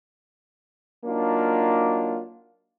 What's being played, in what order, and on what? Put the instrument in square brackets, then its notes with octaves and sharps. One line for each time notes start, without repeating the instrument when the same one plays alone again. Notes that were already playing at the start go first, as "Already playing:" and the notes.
[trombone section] F#3 A#3 D4 D#4 F4